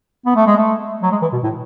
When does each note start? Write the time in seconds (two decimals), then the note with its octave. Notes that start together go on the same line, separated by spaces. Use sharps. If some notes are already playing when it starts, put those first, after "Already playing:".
0.26 B3
0.36 A3
0.47 G#3
0.57 A3
1.03 F#3
1.12 G#3
1.22 E3
1.33 B2
1.44 A2